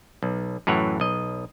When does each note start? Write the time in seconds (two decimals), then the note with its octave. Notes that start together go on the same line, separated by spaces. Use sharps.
0.23 B1
0.67 F#2 A2 E3 C#5 F#5
1.00 B1 D#5